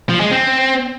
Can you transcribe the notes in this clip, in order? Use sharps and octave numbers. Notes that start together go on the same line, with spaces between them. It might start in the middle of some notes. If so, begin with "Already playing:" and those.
F3
G#3
C4